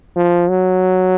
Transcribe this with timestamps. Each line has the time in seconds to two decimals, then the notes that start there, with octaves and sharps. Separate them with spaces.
0.16 F3
0.49 F#3